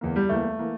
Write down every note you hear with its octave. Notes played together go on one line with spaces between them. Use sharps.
E2 E3 A#3
G3
E2 E3 A3 A#3
E3 A#3